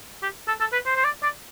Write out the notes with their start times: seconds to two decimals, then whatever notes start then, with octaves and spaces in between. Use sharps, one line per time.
0.23 G4
0.48 A4
0.61 A4
0.73 B4
0.86 C5
0.96 C5
1.04 D5
1.23 D5